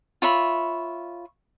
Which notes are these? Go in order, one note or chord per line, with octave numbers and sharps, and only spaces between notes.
F4 C#5 E5 B5